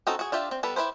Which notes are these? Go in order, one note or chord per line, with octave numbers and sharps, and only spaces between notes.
C4 C#4 D#4 F#4 A4
F#4 G#4
D4 F4 G4 E5
C4
G3 B3 A4 B4
E4 G4 B4 C5